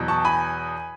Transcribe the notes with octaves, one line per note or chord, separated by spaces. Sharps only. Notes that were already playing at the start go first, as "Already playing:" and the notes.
Already playing: E2 B2 F#3
A5 C#6
G#5 B5